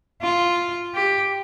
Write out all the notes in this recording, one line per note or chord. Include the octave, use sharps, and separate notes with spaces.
F4
G4